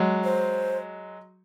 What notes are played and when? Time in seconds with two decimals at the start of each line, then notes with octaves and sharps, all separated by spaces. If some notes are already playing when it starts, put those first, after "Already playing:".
Already playing: F#3 G#3
0.24 C5